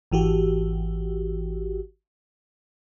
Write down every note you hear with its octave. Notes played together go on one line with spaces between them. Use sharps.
G#1 E3 F#4 G4